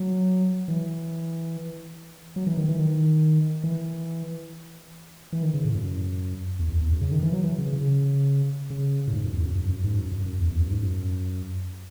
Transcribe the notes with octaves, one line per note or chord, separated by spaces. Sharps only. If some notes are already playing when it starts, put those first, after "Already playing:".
Already playing: F#3
E3
F#3
E3
D#3
E3
D#3
E3
E3
D#3
C#3
A2
F#2
E2
E2
E2
F#2
C#3
D#3
E3
F#3
E3
C#3
C#3
C#3
A2
G#2
F#2
E2
F#2
F#2
F#2
G#2
F#2
F#2
F#2
E2
E2
F#2
G#2
F#2